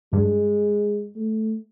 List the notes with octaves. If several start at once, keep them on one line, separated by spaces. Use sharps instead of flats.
G2 G#3
A3